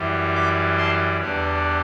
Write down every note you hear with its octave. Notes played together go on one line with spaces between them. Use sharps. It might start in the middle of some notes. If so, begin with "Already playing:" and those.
Already playing: F#2 E3 G3
B5 D6
A5 C6
E2 D3 G3 B3